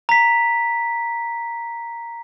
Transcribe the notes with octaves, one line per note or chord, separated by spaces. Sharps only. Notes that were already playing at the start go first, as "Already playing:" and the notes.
A#5 B6